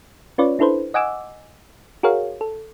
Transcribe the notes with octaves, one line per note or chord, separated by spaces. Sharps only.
C#4 F4 B4 C#5 D5
D4 E4 A4 B4 C5
D#5 F#5 G#5 D6 E6
F#4 G#4 A#4 C#5 F5
A4